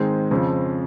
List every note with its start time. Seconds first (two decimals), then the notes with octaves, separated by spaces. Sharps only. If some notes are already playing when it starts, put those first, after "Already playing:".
Already playing: G#2 D#3 G#3 C4
0.31 F2 C#3 F3 C4